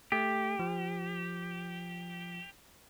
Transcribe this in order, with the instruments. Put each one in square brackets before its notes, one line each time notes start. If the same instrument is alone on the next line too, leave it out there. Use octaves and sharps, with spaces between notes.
[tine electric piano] A3 [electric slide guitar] G4
[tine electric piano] F3